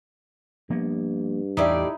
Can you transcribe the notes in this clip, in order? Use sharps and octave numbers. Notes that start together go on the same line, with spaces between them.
G2 F3 A#3 B3
E2 A2 D#4 E4 G4 D5